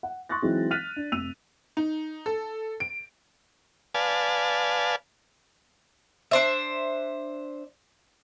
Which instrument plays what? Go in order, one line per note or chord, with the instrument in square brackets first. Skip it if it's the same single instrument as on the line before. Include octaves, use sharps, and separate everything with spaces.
[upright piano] F#5
C6 C#6 D#6 F#6 A6 A#6
E3 F#3 G#3 C4 D#4
F6 F#6 A6 B6 D#7 F7
D4
F1 E6 D#7 F7
[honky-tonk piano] D#4
A4
D7
[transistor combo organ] B4 D5 F5 G#5 A5
[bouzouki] D4 C5 E5